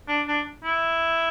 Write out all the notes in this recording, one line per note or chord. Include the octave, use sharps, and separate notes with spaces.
D4
D4
E4